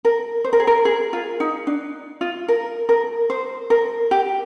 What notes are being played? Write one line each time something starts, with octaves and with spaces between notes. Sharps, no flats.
A#4
C5
A#4
G#4
A#4
G#4
F4
D#4
D4
F4
A#4
A#4
C5
A#4
G4